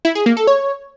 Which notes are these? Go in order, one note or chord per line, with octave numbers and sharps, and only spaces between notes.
E4
G#4
A#3
A4
C#5